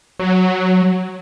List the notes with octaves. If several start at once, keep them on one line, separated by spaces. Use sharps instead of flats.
F#3